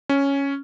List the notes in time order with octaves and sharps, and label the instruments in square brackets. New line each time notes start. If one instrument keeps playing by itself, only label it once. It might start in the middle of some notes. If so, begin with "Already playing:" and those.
[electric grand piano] C#4